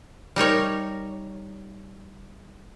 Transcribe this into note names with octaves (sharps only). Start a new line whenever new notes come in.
G3 D#4 A#4 C#5